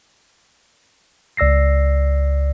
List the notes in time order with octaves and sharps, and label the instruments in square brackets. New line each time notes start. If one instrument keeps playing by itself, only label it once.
[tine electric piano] C#2 D5 E6 A#6 C7